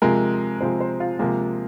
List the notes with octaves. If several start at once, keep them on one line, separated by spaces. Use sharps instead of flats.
C3 F3 G#3 A#4
C3 F3 G#3 C5
C5
F4
C3 F3 G#3 A#3